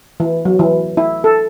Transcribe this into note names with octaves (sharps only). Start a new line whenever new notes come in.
E3
F#3
E3
E4
A4